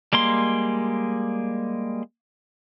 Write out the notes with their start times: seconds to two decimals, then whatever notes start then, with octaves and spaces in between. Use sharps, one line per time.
0.13 G3 G#3 A#3 C6